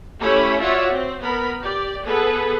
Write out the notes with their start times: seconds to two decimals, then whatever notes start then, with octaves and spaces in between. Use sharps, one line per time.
0.20 A3 C#4 E4 G4 C#5 B5
0.60 F4 F#4 C#5 D5 E5 F#5
0.92 C4
1.22 B3 A#4 B5
1.61 G4 D5
2.05 B3 G#4 A4 B4